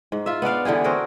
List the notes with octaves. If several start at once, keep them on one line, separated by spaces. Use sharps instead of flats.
G#2
F4 E5
B3 D4 D5 F5
D3 E3 G4 G#4
C4 F#4 G#4 A#4